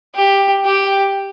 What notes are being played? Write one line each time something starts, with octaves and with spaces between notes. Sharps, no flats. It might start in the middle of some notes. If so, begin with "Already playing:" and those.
G4
G4